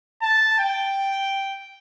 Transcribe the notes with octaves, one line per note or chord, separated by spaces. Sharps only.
A5
G5